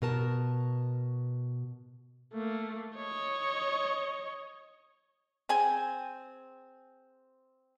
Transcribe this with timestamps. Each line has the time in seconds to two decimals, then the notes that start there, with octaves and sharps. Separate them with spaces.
0.02 B2 A#4 A5
2.33 A3 A#3
2.96 C#5 D#5
5.49 C4 G#4 G#5